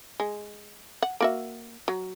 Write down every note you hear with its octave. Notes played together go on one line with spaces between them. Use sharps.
G#3
F#5
A#3 F#4 E5
F#3